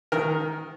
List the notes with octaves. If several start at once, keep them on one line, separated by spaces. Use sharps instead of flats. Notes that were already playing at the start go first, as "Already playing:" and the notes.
D#3 A#4